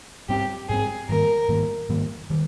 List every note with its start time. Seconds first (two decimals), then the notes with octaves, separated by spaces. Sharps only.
0.29 G#2 G3 C4 G4
0.69 G#2 G3 C4 G#4
1.08 G#2 D#3 G3 A#3 A#4
1.48 G#2 D#3 G3 A#3
1.89 G#2 D#3 G3 A#3
2.30 D#3 G3